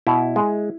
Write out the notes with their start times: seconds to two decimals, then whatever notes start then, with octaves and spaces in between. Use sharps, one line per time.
0.07 B2 E4
0.36 G#3